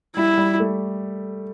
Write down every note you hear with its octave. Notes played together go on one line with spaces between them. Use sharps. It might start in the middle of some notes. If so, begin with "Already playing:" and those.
G3 E4
G3
A3